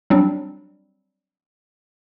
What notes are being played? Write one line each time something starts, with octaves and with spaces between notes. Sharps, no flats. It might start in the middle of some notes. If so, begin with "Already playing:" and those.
F#3 G3 C4 D4